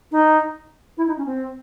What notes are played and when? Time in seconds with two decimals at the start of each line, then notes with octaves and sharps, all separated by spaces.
0.11 D#4
0.97 E4
1.07 D#4
1.17 C#4
1.26 C4